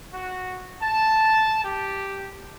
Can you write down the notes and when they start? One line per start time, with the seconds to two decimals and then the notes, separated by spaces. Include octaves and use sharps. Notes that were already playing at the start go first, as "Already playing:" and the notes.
0.13 F#4
0.81 A5
1.63 G4